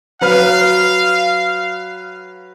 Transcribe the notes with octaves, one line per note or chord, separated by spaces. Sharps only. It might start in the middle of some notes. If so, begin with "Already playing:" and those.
F#3 B4 F5 F6